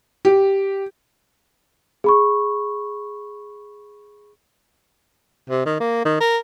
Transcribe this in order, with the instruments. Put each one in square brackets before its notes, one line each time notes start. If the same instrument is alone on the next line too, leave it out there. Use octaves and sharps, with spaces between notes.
[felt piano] G4
[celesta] G#4 B5 C#6
[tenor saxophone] C3
D#3
A#3
D#3
A#4